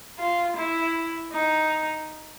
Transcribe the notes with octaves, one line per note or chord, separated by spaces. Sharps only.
F4
E4
D#4